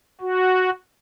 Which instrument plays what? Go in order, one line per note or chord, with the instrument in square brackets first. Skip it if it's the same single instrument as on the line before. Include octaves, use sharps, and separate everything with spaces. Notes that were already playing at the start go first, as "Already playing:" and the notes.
[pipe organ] F#4